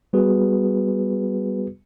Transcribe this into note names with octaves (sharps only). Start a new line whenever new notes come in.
G3 B3 F#4 G#4 B4